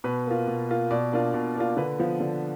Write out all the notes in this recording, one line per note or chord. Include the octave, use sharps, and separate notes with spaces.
B2 B4
A#3 F4
B2
A#3 F4
B2 D5
A#3 D4 F4
B2
A#3 D4 F4
D3 B4
F3 B3
D3